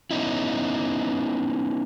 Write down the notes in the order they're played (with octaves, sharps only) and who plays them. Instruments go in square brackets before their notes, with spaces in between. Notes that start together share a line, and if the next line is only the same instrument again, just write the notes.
[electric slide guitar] B3 C#4 D#4 E4